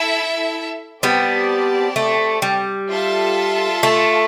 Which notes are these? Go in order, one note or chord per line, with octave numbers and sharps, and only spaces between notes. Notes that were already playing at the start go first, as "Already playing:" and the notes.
Already playing: E4 A4 E5
G3 B3 C4 G4 D5 A5
A3
G3
F4 A4 E5 A5
A3